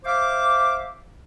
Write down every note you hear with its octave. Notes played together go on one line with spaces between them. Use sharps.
C5 E5 F5 D6